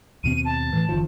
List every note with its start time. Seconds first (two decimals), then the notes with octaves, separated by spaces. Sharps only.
0.24 D#2 B2 C4 D#7
0.45 A5
0.72 A2 E3
0.89 F#1 D#3 F3